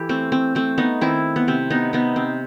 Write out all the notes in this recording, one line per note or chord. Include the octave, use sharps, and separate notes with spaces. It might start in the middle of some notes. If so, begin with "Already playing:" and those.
Already playing: E3 E4 G4 A4
A3 C4
C4
A3 C4
B3 D#4
D#3 C4 E4
B3
C3 C4
B3 D#4
C3 B3 D#4
C4